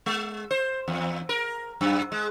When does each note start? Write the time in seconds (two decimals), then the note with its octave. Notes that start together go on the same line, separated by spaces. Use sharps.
0.06 G#3
0.51 C5
0.88 E2
1.29 A#4
1.81 F#2
2.12 G#3